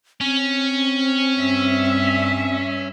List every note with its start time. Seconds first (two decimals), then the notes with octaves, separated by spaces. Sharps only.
0.21 C4 C#4
1.38 G2 E5